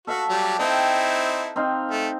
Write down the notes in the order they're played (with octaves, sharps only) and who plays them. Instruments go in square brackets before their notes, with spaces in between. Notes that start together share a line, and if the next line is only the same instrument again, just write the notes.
[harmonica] F#4 [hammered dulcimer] A4 E5 F5
[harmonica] F#3 G3 G4
[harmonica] C4 D#4 E4 [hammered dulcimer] G5 A#5
[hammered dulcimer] C4 D#4 F5
[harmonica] A3